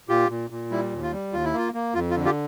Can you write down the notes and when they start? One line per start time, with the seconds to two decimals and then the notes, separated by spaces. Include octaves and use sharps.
0.09 A#2 F4 G4
0.30 A#2
0.50 A#2
0.71 G3 E4
0.92 D#2
1.02 F4
1.12 G3
1.33 D#2 F4
1.44 E4
1.53 A#3 F4
1.74 A#3
1.95 F2 F4
2.11 F4
2.16 D3
2.25 F4 G4